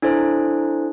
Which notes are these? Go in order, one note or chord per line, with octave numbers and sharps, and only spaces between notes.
D4 E4 A4 C5